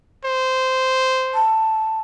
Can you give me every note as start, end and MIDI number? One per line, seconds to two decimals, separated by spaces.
0.25 1.42 72
1.35 2.01 81